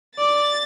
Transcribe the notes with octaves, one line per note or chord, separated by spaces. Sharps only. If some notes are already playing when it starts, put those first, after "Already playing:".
D5 A6